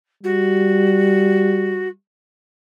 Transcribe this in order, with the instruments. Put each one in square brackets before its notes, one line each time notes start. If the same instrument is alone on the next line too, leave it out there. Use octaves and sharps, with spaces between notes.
[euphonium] G3 [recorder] F#4